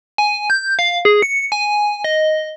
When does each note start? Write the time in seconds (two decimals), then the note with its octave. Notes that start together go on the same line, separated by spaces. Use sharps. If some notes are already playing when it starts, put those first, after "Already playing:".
0.18 G#5
0.50 G6
0.79 F5
1.05 G#4
1.22 C#7
1.52 G#5
2.04 D#5